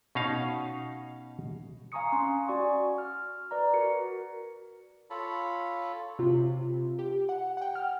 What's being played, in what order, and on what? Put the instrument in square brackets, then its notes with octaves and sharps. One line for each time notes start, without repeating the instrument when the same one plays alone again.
[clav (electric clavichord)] B2 C#4 D#4 F5
[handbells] F5 G#5 A#5 C#6 D#6 C#7
C#4 C6
F#4 D5 G#5 C#6
F6
B4 D5 A#5
F#4 A#4 C#7
[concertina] F4 A4 C#5 A5 B5
[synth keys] C3 F4
G4
F#5
F#5 G5
F6